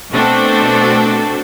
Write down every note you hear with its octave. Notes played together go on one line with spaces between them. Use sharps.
B2 A3 C4 D4 F#4 A4